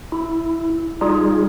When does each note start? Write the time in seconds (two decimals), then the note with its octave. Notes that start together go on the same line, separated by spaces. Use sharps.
0.12 E4
1.01 G3 D#4 F4 G#4